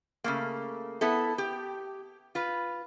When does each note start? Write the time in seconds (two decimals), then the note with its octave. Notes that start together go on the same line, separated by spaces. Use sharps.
0.24 C#3 A3 A#3
1.01 B3 E4 A4
1.38 G4
2.35 F4 B4